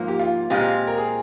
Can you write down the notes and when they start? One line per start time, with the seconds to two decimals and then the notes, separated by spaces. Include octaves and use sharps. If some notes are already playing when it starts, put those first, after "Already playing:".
Already playing: G#2 F3 A#3
0.08 G4
0.19 F4
0.50 A#2 G#3 C4 F4 G4
0.87 A#4
0.98 G#4